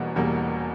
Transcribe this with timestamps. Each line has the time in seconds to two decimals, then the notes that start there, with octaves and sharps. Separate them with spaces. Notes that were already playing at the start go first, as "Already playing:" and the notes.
Already playing: E1 E2 B2 G3 A#3
0.16 E1 E2 B2 G3 A#3